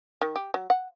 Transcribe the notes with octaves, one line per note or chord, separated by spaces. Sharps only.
D#3
G4
F#3
F#5